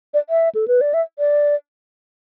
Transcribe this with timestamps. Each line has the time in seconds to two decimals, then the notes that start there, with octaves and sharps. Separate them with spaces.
0.14 D5
0.30 E5
0.55 A4
0.68 B4
0.81 D5
0.94 E5
1.19 D5